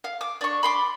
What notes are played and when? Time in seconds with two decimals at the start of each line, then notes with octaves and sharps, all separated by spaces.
0.04 F5
0.21 D6
0.41 D4 C#6
0.63 B5 C6 D6